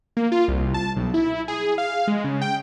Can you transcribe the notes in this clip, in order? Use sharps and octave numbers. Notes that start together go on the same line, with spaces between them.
A#3
F4
C2
A5
B1
E4
G#4
F5
G#3
C#3
G5